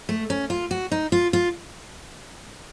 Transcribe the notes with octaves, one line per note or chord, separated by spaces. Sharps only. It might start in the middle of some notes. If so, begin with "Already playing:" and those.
A3
C#4
F4
F#4
D#4
F4
F4